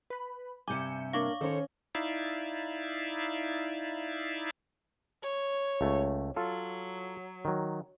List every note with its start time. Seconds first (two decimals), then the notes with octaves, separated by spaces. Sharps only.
0.10 B4 B5
0.68 G2 C3 E5 G#5 D6 G6 C#7
1.13 A#3 D4 C#5 F5 C#6 D6
1.41 D#3 C#4 A4 C5 C#5
1.95 D#4 E4 D5 E5 F5
5.23 C#5
5.81 C#2 A3
6.36 F#3 F4 A4
7.45 D#3 F#3